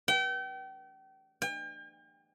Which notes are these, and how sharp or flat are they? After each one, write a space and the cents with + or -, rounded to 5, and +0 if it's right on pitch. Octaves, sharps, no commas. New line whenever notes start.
G5 -35
G5 +40